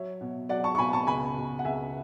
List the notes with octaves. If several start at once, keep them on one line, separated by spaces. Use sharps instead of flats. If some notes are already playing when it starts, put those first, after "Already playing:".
Already playing: F#3 C#5 E5
B2
F#3 D5 F#5
A5 C#6
C#6
B2 G#5 B5
A5 C#6
C#2 G#5 B5
B2
F#5
C#2 E5 G#5